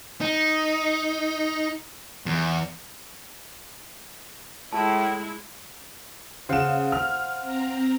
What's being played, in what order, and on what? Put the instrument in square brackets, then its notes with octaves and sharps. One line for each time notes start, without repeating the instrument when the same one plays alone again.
[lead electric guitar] D#4
E2
[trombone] A2 [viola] G#3 E4 [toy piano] A5
[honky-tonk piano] C#3 E7 [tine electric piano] C5 F5 F#5
[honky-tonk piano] F6
[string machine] C4 A#5